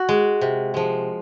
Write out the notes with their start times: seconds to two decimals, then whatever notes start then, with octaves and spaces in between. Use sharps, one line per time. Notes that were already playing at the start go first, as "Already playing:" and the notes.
Already playing: F#4
0.09 G#3
0.41 C3
0.74 F3 G#3